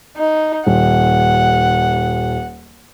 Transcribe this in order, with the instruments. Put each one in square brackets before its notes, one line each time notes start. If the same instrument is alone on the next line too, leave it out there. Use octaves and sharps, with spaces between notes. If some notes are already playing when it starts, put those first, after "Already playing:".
[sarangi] D#4
[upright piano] D#1 [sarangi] F#5